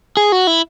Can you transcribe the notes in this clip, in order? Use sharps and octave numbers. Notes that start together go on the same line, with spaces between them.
G#4
F#4
E4